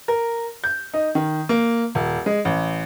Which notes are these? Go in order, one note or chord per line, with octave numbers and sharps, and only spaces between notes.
A#4
G6
D#4
D#3
A#3
D#1
G#3
A1